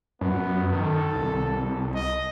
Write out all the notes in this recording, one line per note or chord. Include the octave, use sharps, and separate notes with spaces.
F#2 B3
D#3 A4
C2
D#5